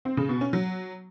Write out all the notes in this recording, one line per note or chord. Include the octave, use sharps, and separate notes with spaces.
C4
C#3
B2
C#4
F#3